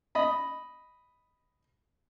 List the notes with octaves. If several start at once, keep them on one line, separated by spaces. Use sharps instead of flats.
D#5 B5